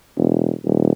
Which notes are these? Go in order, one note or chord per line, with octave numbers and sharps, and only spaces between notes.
E1
D#1